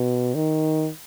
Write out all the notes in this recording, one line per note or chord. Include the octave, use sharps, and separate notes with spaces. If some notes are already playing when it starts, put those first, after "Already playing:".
Already playing: B2
D#3